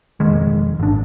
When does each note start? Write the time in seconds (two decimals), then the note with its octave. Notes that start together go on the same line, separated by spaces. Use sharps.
0.20 E1 F2 D#3 G#3
0.80 G#1 D4